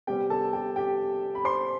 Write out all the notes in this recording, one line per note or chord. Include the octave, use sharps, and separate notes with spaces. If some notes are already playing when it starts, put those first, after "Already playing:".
C3 G3 B3 G4 G5
A4 A5
G4 G5
G4 G5
B5
C5 C6